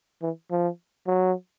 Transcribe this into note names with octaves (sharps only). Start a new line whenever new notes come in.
E3
F3
F#3